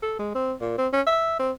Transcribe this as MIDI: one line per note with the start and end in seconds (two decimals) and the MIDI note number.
0.02 0.16 69
0.19 0.31 56
0.35 0.53 60
0.61 0.76 46
0.78 0.88 60
0.93 1.02 61
1.07 1.39 76
1.39 1.52 60